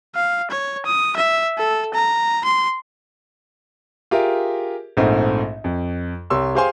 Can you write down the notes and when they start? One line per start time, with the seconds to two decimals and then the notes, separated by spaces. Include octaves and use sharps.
0.15 F5
0.51 C#5
0.86 D#6
1.16 E5
1.58 A4
1.94 A#5
2.45 C6
4.11 F4 G4 G#4 A#4 E5
4.97 A#1 G#2 A3 C4 D#4
5.64 F2
6.30 C2 G4 C#5 C6 E6
6.55 G4 G#4 C5 F5 G#5 C6